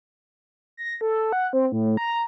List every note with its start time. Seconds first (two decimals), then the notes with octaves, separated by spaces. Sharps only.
0.77 A#6
1.01 A4
1.33 F#5
1.53 C4
1.72 A2
1.97 A#5